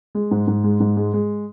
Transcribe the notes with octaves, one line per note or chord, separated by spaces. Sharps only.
G#3
G#2
G#2
G#3
G#2
G#3
G#3